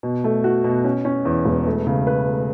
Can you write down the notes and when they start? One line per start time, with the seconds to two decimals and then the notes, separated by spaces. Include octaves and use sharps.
0.03 B2
0.24 A3
0.44 F#4
0.64 B2
0.85 C#4
1.05 C#4
1.25 E2
1.45 E1
1.66 A3
1.87 C#3
2.07 B4
2.28 A3